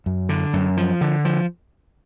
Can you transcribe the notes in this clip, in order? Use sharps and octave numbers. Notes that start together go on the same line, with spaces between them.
F#2
D3
F#2
F3
D3
F3